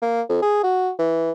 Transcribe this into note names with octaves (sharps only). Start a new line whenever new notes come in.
A#3
F2
G#4
F#4
E3